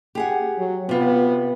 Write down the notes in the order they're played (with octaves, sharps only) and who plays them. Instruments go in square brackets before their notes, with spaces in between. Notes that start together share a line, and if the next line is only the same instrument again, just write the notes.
[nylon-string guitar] G4 G#4 F#5
[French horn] F#3
[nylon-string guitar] C3 F4 [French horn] B3